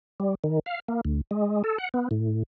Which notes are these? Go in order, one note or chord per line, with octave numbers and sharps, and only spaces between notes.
G3
D#3
F5
A#3
D2
G#3
A4
F#5
B3
A2